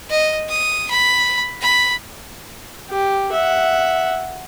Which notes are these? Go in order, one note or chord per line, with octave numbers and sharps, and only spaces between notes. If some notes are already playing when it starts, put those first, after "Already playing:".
D#5
D#6
B5
B5
G4
E5 F#5